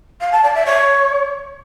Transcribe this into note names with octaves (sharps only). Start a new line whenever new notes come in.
F5
A5
D5
E5
C#5